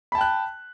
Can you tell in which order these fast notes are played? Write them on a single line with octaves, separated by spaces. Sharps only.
B5 A5 G5 F#6